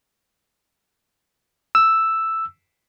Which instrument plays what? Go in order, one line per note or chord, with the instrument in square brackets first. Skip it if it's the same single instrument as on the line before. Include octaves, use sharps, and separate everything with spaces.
[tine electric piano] E6